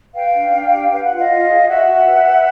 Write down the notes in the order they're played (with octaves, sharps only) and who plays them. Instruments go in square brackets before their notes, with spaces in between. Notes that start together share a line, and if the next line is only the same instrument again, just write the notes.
[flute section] B4 F5 G5
D4
D4
G4
B4 F5
F#5
F4
D#5 F5
F4
G#4
F#4 E5 F#5
F#4
B4
B4